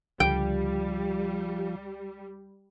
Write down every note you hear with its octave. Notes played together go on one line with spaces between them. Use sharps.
C#2 D3 F3 G3 G5